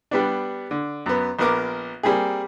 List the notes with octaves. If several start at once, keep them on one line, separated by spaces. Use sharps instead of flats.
G3 B3 D4
D3
F#2 B3
A#1 B3 A#4 D6
G3 A#3 C4 G#4